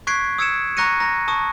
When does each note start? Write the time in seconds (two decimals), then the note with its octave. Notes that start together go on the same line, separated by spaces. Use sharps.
0.07 C#6 F#6 G#6 B6 C7 D7
0.38 D#6 E6 G#6 C#7 D7 E7
0.77 A#5 C#6 F#6 A#6 C#7 D#7
1.00 A#5 A#6
1.28 A5 C#6 D#6